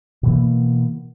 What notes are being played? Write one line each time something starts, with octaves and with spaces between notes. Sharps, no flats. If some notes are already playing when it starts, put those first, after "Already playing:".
B2 E3 A#3